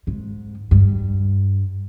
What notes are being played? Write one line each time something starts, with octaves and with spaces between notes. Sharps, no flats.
G#2
G2